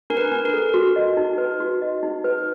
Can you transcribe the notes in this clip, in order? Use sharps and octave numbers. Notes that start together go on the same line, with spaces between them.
D4 A#4
B4
D4
A#4
A4
F#4
D#5
D#4
B4
F#4
D#5
D#4
B4